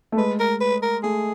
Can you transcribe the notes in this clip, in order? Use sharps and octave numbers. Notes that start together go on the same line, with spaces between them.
A3
G#3 B4
A#4
B4
A#4
A3 G#4